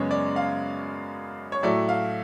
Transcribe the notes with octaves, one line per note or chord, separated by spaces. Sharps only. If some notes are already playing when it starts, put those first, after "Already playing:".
Already playing: F#2 C#3 G#3 B3 C#5
D5
F5
C#5
A2 F#3 A3 D5
F5